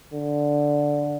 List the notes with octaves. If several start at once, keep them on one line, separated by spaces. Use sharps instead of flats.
D3